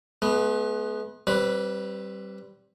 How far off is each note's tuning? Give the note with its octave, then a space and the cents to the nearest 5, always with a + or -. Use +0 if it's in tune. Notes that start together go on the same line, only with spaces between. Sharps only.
G#3 +45 B3 +0
G3 -15 C4 +20 B4 +0